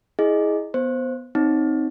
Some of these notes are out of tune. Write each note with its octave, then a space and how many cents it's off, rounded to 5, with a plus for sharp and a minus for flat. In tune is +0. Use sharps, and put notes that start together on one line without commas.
E4 -15 G#4 +10 D#5 -10
B3 +0 C5 +0
C4 +0 D#4 +0 C#5 -20